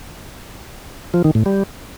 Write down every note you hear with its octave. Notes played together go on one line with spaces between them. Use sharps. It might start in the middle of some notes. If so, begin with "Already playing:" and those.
F3
D#3
A2
G3